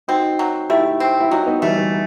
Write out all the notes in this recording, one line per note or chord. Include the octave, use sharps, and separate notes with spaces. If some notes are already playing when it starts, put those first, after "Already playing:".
C4 D#4 F#4
F#3
A3 E4 G4
C4
E4
F#3 D#4 F#4
B3 D#4
E3 G3 A3
E3